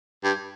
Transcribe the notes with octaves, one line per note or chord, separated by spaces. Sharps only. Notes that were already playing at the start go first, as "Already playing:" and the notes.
G2